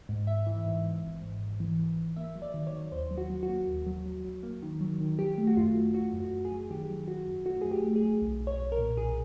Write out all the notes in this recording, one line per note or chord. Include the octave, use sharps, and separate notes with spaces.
G#2
G#1 E5
E3
G#2
G#2
G#1
G#2
G#1
E3
E3
G#1
A#3 E5
F#3
D5
D#3
D5
C#5
D#3
D#2 C5
F#3
F#4
F#3
F#4
A#3
D#2
F#3
F#3
F#3
A#3
D#3
F#3
D#3
F#3 G4
A3
F#4
F#2 F4
A3
A3 F#4
F#2
F#4
F#2
G#4
F#3
D#3 G4
F#3
F#3 F#4
F#2
A3 F#4
F#2 G#4
G4
A3
G#4
F#2
B1
B1
C#5
B1
A#4
A#2
B1 G#4